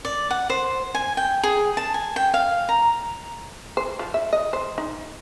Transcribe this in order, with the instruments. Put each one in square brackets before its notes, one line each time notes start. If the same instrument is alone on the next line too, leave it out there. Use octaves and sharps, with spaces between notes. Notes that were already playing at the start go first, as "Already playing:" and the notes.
[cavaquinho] D5
F#5
C5
G#5
G5
G#4
A5
G#5
G5
F5
A#5
[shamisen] C5
F3
E5
D#5
C5
D#4